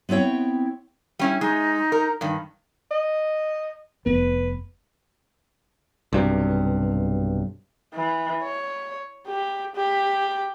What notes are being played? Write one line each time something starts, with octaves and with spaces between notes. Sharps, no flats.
B3 C4 E4 C#5 G5
G3 C#4 E4
G#3 D#4
A#4
G2 D#3
D#5
F1 B3 B4
B1 G2 C3
E3
C#5
G4
G4